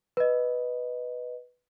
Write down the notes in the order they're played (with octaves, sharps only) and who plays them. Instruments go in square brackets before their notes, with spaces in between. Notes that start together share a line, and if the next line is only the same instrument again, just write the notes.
[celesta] B4 D#5